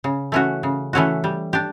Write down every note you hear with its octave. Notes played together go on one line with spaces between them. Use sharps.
C#3
E3 A3 C#4 F#4
C#3
E3 A3 C#4 F#4
G3
D4 G4